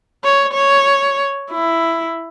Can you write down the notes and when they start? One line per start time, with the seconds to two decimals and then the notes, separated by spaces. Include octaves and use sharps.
0.24 C#5
0.54 C#5
1.51 E4